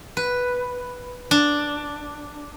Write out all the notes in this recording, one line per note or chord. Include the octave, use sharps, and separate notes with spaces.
B4
D4